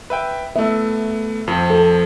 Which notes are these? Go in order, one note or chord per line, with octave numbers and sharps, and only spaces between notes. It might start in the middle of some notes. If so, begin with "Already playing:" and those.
B4 E5 G5
A3 B3 E5
F2 F3 C4
A4